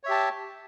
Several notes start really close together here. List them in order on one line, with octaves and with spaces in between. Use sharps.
C#5 E5 G4 A5